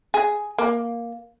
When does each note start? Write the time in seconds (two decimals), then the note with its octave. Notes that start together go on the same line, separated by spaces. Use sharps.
0.14 G#4
0.58 A#3